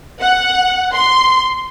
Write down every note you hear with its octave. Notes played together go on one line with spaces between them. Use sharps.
F#5
C6